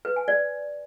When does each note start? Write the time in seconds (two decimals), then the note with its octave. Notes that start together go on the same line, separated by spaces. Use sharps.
0.05 B4
0.16 G#5
0.28 D5